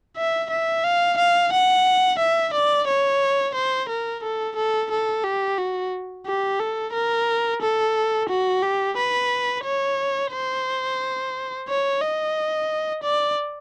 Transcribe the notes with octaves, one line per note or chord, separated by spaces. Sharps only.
E5
E5
F5
F5
F#5
E5
D5
C#5
C5
A#4
A4
A4
A4
G4
F#4
G4
A4
A#4
A4
F#4
G4
B4
C#5
C5
C#5
D#5
D5